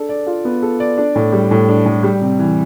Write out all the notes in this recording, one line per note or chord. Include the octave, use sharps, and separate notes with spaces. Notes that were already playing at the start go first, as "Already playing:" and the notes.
Already playing: D4 A4
D5
F4
B3
A4
D5
D4
A2
G3
A2
D4
A2
G3
C3
E3